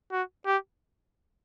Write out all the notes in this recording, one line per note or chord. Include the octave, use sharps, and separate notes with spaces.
F#4
G4